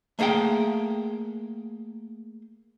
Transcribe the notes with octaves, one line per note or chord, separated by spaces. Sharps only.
A3 A#3 G#4 F#5 G5